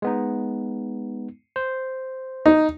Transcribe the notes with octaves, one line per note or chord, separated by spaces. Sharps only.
G#3 B3 D#4
C5
D#4